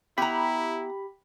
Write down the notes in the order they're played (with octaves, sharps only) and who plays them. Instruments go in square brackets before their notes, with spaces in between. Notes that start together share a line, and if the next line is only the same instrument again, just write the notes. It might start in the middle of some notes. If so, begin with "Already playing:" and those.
[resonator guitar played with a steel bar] B3 A#5 [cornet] E4 [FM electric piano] G4 B5